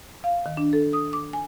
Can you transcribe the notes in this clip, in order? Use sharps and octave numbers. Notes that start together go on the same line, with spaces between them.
F5
D#3
D4
A4
D#6
D6
G#5